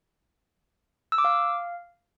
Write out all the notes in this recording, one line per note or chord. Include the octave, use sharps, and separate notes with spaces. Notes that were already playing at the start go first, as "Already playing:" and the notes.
E6
D6
F5